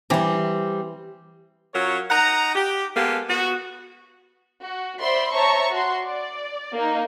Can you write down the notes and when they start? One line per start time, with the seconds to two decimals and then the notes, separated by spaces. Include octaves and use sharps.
0.10 E3 G3 C4 G4 A#5
1.74 F#3 C#4 F4 A#4 C#5
2.10 D#4 F#5 A#5
2.55 G4
2.96 G#3 A#3 B3 G4 A4
3.29 B3 F#4
4.63 F#4
5.01 C5 D5 E5 B5 C6
5.34 C5 C#5 E5 A5 A#5 C#6
5.71 F#4 C6
6.02 D5
6.75 A#3 D#4